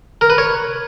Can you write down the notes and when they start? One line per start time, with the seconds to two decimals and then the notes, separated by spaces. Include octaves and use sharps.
0.21 A#4
0.30 B4
0.38 C#5